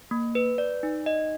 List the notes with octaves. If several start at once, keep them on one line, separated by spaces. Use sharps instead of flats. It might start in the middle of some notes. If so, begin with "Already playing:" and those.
A#3
B4
D5
D#4
D#5